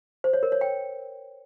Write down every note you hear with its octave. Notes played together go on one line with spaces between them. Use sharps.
C5
C#5
A#4
C#5
G5